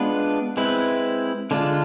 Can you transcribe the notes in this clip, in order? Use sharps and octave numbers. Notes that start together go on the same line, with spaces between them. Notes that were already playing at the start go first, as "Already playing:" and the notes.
Already playing: G#3 B3 D4 F4 B4
G#3 C4 E4 B4
D3 G#3 D4 F4